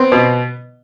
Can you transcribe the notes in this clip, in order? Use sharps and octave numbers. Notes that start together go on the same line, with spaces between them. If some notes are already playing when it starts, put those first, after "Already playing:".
Already playing: B3 C4
B2